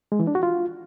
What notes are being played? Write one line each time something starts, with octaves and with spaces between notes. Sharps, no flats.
G#3
E3
D4
F#4
F4